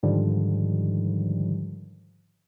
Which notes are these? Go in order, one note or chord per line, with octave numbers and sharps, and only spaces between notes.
G#2 D3 D#3 F3 G3